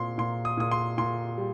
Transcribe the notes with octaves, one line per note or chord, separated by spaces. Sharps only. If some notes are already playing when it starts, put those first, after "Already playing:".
Already playing: A#2 C4 C6
A#2 C6
D#6
A#2 D#6
C6
A#2 C6
G3